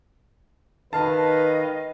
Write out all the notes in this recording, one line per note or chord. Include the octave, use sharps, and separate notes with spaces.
D#3 B4 D#5 F5 A5